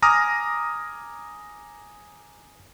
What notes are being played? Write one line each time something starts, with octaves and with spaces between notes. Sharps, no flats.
G#5 A#5 D6 D#6 F6 A#6